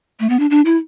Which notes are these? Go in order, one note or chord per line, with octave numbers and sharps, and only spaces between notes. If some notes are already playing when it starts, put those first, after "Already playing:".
A3
B3
D4
D4
E4